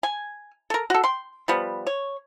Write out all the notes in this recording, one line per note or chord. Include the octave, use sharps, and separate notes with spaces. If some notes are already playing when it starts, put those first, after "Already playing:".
G#5
A4 A#4
F#4 A4
G5 C6
F3 G3 B3
C#5